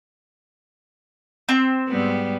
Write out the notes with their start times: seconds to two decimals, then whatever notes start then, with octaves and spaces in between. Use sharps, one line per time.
1.49 C4
1.89 G#2 G3 B3